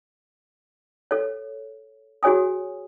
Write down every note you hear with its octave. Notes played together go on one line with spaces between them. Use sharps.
A4 C#5
F#4 G#4 C#5 G#5 D#6